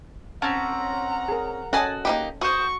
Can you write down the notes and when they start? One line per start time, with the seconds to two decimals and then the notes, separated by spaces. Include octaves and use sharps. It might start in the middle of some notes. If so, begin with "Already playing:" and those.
0.42 C4 C#4 F#5 A5 A#5
1.28 G#4 A#4
1.73 C#4 F#4 A4 D#5 F#5 G#5 A5
2.05 A#3 D#4 G4
2.41 F#4 C5 C#6 D#6